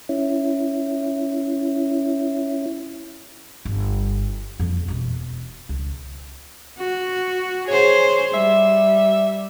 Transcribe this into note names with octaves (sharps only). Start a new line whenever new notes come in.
C#4 E4
G1
F2 A#3
E1 B2
C#2
F#4
G#4 C5 C#5
G3 E5